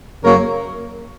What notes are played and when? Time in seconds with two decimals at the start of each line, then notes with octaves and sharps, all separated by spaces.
0.23 F#2 C#3 F#3 A#3 A#4 C#5